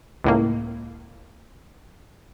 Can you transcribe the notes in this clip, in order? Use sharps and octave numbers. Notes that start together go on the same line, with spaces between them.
C#2 A2 A#3